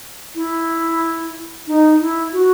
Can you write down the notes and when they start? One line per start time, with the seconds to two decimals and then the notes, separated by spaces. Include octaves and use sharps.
0.35 E4
1.67 D#4
2.00 E4
2.33 F#4